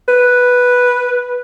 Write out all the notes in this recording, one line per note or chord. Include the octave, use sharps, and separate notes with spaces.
B4